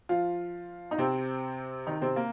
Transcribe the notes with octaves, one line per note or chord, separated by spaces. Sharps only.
F3 F4
D#4
C3 C4
D#3 D#4
C3 C4
A#3